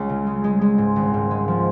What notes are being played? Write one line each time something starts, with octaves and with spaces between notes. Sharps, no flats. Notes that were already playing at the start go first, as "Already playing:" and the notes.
Already playing: C#2 G#3 C#4
C#3
G#3
G#3
G#3
G#2
G#1
G#2
G#3
F3